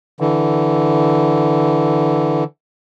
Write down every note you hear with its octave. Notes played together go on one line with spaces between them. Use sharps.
D3 E3